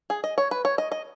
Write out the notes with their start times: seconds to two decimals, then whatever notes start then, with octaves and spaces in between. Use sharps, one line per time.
0.10 G#4
0.24 D#5
0.38 C#5
0.51 B4
0.65 C#5
0.78 D#5
0.92 D#5